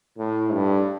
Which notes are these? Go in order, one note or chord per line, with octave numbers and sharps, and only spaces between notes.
A2
G2